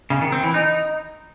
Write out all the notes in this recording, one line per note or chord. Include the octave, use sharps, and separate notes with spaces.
C#3
D#3
C4
E3
D#4